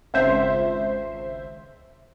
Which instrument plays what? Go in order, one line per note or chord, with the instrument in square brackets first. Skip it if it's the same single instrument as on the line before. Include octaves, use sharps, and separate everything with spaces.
[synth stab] G#1 C#2 C5 E5